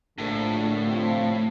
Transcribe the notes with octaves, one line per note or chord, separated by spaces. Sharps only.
A#1 A2 D3
C3 F3 F4